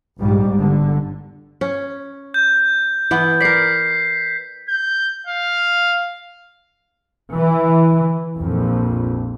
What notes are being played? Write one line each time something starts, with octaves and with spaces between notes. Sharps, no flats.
A#1 G#2 G3
G1 D3
C#4
G6
E3 B3
A#4 D5 B6 C7
G6
F5
E3
A#1 F2